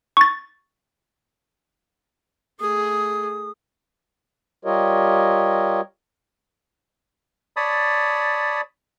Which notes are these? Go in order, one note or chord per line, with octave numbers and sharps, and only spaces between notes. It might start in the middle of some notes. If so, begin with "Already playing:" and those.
C#6 A6
A3 G#4 D#6
G3 F4 G4 A#4 C#5 D#5
C#5 D5 A5 B5 D#6